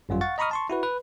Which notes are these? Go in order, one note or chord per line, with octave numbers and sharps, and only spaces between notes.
G#1 F#2 G3 F4
F5 F#5 C#6 A6
D#5 A#5 B5 C#6 D#6 F6
A5 C6 C#6
E4 F#4 B4
B4